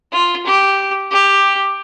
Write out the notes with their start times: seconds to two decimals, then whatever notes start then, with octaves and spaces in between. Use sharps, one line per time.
0.12 F4
0.46 G4
1.11 G4